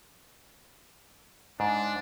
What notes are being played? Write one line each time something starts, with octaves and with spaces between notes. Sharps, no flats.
G#2 D4